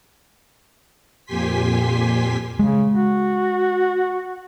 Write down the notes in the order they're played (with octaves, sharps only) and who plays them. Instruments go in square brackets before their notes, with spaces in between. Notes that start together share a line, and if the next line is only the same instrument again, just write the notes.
[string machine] F2 A#2 G4 G#5 C6 B6
[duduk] C#3 [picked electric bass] G#3
[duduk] F#4